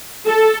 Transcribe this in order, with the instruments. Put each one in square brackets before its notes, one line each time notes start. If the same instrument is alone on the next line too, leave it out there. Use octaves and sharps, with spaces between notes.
[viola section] A4